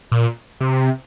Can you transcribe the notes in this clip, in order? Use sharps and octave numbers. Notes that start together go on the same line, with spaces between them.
A#2
C3